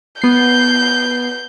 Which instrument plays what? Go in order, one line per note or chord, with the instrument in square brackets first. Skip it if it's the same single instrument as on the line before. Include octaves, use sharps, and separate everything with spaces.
[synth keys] B3 C7 [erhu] G6